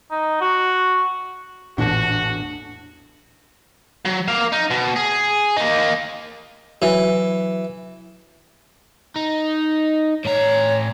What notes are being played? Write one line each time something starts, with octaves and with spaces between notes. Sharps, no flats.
D#4
F#4
A1 E2 A#2 E3 D4 F#4
F#3
A#3 F5
D#4
B2
G#4
A#3 D#4
E3 F#3
D#4
A2 C#5 A#5